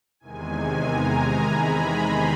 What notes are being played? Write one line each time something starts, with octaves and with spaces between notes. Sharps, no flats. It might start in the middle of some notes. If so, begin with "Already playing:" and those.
E2 C3 D#3 G#3 G#5
A#5
B5
C6